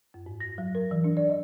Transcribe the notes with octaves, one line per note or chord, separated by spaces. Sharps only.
F#2
G#2
A#6
F#3
A#4
E3
D4
D5
D#5